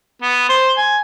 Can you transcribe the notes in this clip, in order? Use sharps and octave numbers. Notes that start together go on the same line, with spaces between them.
B3
C5
G#5